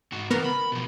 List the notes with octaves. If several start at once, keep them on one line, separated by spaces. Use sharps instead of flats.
G#2 F#4
C#2 E3 B3 A#4
B5
B2 F3